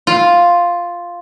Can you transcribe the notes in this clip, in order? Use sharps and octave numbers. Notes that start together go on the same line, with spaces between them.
F4